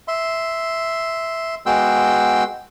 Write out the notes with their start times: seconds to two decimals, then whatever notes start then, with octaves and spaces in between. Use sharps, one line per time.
0.08 E5 C6
1.66 G#3 B3 F#4 G5 C6 E6